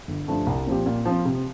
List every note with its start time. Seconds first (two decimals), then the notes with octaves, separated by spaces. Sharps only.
0.08 G1
0.28 G2 F3 A3
0.47 C2
0.66 A#2 F3 C4 G4
0.86 A#2
1.06 F3 C4
1.25 C3